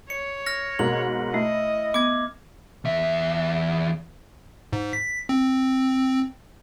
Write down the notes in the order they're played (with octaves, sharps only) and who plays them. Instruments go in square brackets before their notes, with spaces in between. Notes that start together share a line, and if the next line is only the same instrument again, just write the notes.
[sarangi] C#5 [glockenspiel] C#7
[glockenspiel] F6 A#6
[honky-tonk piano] G#2 B2 A#3 [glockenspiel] F#7
[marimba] A3 [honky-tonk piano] E4 [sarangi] D#5
[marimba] B3 [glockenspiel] D6 G#6
[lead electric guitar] E2 E5
[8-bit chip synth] G#2
B6
C4